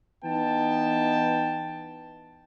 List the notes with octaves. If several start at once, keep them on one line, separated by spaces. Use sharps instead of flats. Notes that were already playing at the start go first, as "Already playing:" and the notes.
E3 B3 D#4 G5 A5